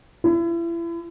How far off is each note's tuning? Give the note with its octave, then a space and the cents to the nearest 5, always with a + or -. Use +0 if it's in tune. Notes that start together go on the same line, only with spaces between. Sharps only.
E4 +35